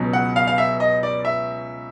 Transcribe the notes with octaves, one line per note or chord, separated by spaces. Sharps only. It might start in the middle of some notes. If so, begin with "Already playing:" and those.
Already playing: C#2 B2 F#3
F#5
F5
F5
E5
D#5
D5
E5